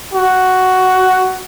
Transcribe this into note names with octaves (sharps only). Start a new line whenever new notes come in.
F#4